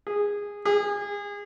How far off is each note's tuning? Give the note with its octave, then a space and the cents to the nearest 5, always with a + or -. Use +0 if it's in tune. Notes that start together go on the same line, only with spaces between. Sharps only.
G#4 -15
G#4 -30